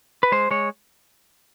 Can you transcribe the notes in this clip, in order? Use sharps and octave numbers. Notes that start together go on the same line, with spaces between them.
B4
G#3 C5
G#3 C#5